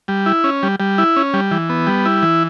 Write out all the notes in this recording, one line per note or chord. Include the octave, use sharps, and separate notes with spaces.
G3
E4
C#4
G3
G3
E4
C#4
G3
E3
B3
G3
E4
E3